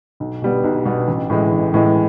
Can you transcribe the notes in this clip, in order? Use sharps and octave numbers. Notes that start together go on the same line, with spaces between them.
B1
B2 G3 B3
B1
B2 G3 B3
A1
A2 E3 G#3
A1
A2 E3 G#3